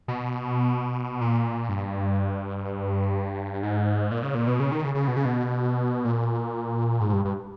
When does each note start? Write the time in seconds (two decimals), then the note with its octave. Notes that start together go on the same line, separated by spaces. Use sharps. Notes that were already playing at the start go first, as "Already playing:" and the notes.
0.08 B2
1.21 A#2
1.69 G2
3.63 G#2
4.11 A#2
4.23 C#3
4.35 A#2
4.47 B2
4.60 C#3
4.72 D#3
4.84 C#3
4.95 C#3
5.08 B2
5.16 C#3
5.25 B2
6.05 A#2
7.00 G#2
7.13 G2
7.25 G2